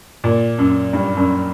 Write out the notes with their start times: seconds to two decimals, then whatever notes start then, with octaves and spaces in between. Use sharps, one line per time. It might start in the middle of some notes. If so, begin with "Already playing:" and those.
0.24 A#2
0.59 F#2
0.93 G2
1.17 F#2